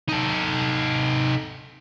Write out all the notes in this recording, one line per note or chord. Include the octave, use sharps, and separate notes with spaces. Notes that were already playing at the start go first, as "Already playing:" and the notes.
D#4 A4